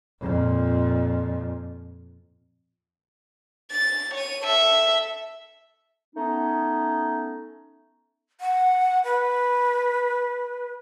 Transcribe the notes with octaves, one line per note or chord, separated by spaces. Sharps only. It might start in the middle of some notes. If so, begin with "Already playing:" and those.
F2 A#2
A6
C#5 D#7
A4 E5
A3 B3 C#4 D#4
F#5
B4